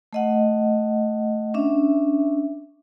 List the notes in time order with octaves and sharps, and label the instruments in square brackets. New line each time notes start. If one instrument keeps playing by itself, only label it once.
[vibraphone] A3 D#5 F#5
C#4 D4 E5